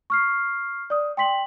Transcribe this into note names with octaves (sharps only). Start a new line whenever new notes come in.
C#6 F6 C7
D5 D#6
G5 C6 B6 F#7